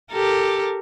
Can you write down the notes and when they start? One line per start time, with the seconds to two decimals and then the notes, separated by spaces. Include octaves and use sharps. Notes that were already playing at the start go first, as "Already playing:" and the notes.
0.11 G4 A4 A#4